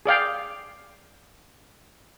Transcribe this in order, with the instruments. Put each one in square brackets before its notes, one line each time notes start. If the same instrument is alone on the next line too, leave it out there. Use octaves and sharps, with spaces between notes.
[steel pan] G#4 D5 F5 G5